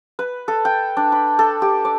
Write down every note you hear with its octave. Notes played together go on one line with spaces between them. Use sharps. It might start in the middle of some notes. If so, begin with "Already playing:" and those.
B4
A4
G5
D4
B5
A4
G4
D5